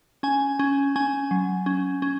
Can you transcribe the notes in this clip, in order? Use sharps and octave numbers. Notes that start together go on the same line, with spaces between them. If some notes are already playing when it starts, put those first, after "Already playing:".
C#4 G#5
C#4
C#4 G#5
F#3
C#4
C#4